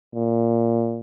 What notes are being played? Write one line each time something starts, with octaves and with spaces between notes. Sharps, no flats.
A#2